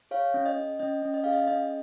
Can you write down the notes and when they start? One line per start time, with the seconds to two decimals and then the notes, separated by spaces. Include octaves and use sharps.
0.11 G#4 C#5 F5
0.34 C#4
0.46 D#5
0.57 C#4
0.79 C#4 D#5
1.02 C#4
1.14 D#5
1.24 G#4 F5
1.33 D#5
1.48 C#4 D#5